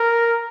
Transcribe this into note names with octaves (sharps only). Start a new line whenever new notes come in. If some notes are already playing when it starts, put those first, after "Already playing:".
Already playing: A#4